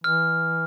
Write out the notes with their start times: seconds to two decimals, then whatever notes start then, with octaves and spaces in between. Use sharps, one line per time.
0.04 E3 F6